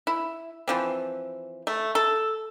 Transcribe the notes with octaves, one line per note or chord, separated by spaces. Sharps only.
E4
E3 F3 C4
A3
A4